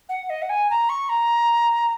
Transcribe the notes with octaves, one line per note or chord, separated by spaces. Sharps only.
F#5
D#5
F#5
G#5
A#5
C#6
A#5